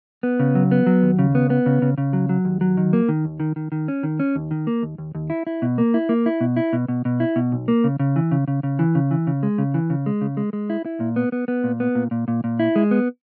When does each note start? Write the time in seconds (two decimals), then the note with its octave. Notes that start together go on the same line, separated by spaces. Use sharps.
0.23 B3
0.39 C#3
0.55 F#3
0.71 B3
0.86 F#3
1.03 D#2
1.19 C#3
1.35 B3
1.50 B3
1.66 C#3
1.82 C#3
1.98 C#3
2.13 F#3
2.29 F#3
2.45 D#2
2.61 F#3
2.77 D#3
2.93 A#3
3.09 D#3
3.25 D#2
3.40 D#3
3.56 D#3
3.72 D#3
3.88 C#4
4.03 D#3
4.20 C#4
4.36 D#2
4.51 D#3
4.67 A#3
4.83 D#2
4.98 D#2
5.15 D#2
5.30 E4
5.47 E4
5.62 B2
5.78 A#3
5.94 E4
6.09 A#3
6.26 E4
6.41 B2
6.56 E4
6.73 B2
6.88 B2
7.05 B2
7.20 E4
7.36 B2
7.52 B1
7.68 A#3
7.84 C#3
8.00 C#3
8.16 E3
8.32 C#3
8.48 C#3
8.63 C#3
8.79 E3
8.95 C#3
9.11 E3
9.27 C#3
9.43 G#3
9.58 C#3
9.74 E3
9.90 C#3
10.06 G#3
10.21 C#3
10.37 G#3
10.53 G#3
10.70 E4
10.85 E4
11.00 A#2
11.16 B3
11.32 B3
11.48 B3
11.64 A#2
11.80 B3
11.95 A#2
12.11 A#2
12.28 A#2
12.44 A#2
12.60 E4
12.76 G#3
12.91 B3